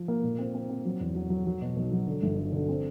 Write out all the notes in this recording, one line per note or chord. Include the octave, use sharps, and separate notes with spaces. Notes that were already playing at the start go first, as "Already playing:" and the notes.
Already playing: F3
A#3
A#2
C4
C4
C4
F#3
E2
F#3
F#3
F#3
B2
B1
F#3
D3
G1
D3
D3
C4